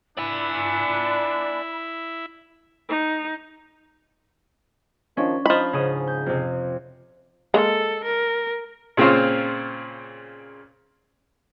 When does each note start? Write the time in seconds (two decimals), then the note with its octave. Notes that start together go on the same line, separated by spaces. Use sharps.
0.18 B3 D4 E4 D5 G#5 B5
2.88 D#4
5.17 D#3 F3 C#4 D4
5.46 F3 D#4 B5
5.73 G#2 C#3 D#6
6.07 G6
6.26 F2 C3
7.54 G#3 A#3 A4
8.04 A#4
8.97 A#2 C#3 C4 F4 C5 C#5